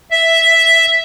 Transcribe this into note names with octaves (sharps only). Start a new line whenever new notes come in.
E5